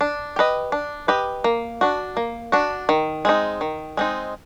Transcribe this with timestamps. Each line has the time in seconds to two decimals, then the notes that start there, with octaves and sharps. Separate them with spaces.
0.01 D4
0.36 G4 B4 D#5
0.72 D4
1.08 G4 B4 D#5
1.44 A#3
1.81 D4 F#4
2.17 A#3
2.52 D4 F#4
2.89 D#3
3.25 G#3 C4 D#4
3.61 D#3
3.97 G#3 C4 D#4